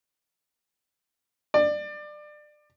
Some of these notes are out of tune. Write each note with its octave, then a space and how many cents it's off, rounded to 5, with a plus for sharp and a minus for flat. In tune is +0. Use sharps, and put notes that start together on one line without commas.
D5 +25